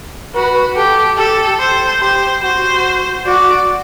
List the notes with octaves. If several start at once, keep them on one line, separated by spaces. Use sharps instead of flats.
F#4 B4
G4 A4
G4 A4
C5
G4 C5
F#4 C5
F#4 D5